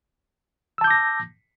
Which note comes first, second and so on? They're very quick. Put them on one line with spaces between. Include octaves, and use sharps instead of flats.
E6 A5 G6 D6 A#6